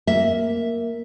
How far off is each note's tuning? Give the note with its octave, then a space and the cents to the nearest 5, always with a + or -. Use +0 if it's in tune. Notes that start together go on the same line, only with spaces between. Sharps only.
A#3 +0 E5 +0